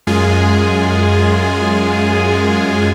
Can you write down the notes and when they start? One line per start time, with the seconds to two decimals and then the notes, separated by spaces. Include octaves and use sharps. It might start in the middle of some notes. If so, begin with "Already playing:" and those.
0.07 F#2 G#3 F4 G#4 G#5